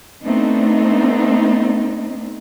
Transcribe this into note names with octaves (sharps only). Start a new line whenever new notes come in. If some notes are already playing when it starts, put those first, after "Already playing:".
A3 B3 C4 D4 D#4